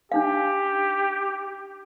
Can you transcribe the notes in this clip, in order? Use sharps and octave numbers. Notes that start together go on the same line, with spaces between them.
D4 D#4 G4 F5